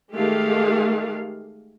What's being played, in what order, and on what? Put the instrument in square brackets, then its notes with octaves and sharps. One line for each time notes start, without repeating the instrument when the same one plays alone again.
[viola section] D#3 G#3 A3 G4 F5